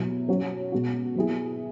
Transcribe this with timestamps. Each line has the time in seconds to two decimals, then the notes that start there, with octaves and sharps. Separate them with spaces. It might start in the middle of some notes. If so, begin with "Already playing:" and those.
Already playing: B2 F#3 B3 E4
0.28 F#3 C#4 F#4
0.72 B2 G#3 B3 F#4
1.16 F#3 B3 E4 G#4